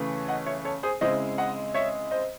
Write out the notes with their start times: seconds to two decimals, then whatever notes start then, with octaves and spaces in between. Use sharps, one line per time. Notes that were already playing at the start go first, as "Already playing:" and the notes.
Already playing: C#3 E3 A3 C#4
0.28 D#5 F#5
0.46 C#5 E5
0.65 A4 C#5
0.83 G#4 C5
1.01 C#3 G#3 C4 E4 C5 D#5
1.38 D#5 F#5
1.74 C#5 E5
2.11 C5 D#5